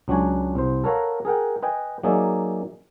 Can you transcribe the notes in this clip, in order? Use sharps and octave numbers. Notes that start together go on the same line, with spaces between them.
C#2 F#3 D4 F#4 G#5
C2 C5
A4 A#4 C#5 F5 F#5 A#5
G#4 A#4 F#5 G5
B4 D#5 G5 G#5
F#3 A#3 D#4 G#4 D5 E5